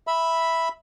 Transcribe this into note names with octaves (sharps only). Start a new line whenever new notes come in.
E5 B5